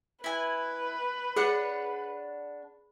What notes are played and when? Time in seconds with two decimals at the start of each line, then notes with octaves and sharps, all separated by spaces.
0.24 E4 B4 G#5
1.36 D4 G#4 C#5 F#5